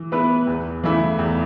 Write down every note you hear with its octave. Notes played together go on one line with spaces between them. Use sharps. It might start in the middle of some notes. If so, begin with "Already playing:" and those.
Already playing: E3
B3 E4 B4
E2
C#3 E3 A3 E4
E2